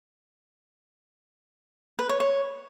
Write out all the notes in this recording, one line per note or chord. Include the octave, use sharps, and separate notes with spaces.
B4
C#5
C#5